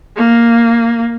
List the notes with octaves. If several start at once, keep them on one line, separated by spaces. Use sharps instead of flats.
A#3